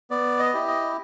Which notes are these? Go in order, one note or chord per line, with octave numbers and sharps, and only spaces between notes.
B3 D5
D#5
E4 G4
D#5